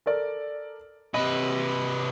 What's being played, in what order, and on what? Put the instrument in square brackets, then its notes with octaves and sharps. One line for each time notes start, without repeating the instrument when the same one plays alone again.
[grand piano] A4 A#4 D5
[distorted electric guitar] C3 B4 [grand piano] D#5